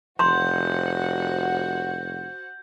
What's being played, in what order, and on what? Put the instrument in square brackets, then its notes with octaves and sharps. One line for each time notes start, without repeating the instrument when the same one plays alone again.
[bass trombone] F1 [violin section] F#4 C5 F#5 [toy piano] A#5 C6 [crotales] G6